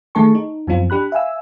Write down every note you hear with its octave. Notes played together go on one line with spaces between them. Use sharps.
D#3 A3 G#4 A5 C#6
D#4
F#2 F3 B3 C4 F4
D4 G4 B5 F#6
E5 F5 G#5 E6